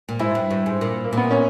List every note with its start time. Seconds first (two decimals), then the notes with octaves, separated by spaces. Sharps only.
0.09 A#2
0.19 G#2 E4
0.35 G2
0.50 G2
0.66 G#2
0.81 A#2
1.04 A#3
1.13 A#2 B3
1.31 C#4